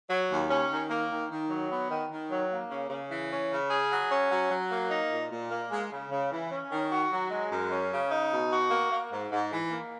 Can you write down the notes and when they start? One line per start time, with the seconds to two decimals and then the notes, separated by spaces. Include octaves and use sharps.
0.10 F#3
0.30 D#2
0.49 C#4
0.70 D#3
0.89 A#3
1.09 D#3
1.29 D#3
1.50 F#3
1.70 B3
1.90 D#3
2.10 D#3
2.30 F#3
2.50 A#3
2.69 C#3
2.89 C#3
3.10 E3
3.30 C#4
3.49 C#3
3.70 G#4
3.90 F#3
4.10 C#4
4.30 F#3
4.49 F#3
4.71 A#3
4.90 D#4
5.10 A#2
5.29 A#2
5.50 A#3
5.70 G#3
5.90 C#3
6.10 C#3
6.30 E3
6.51 C#4
6.70 D#3
6.91 F#4
7.10 F#3
7.30 G#3
7.50 F#2
7.71 C#4
7.91 C#3
8.10 D#4
8.30 B2
8.51 F#4
8.70 A#3
8.91 A#3
9.10 G#2
9.31 G#2
9.51 E3
9.70 A#3